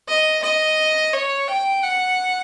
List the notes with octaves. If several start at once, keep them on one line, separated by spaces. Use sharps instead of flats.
D#5
D#5
C#5
G5
F#5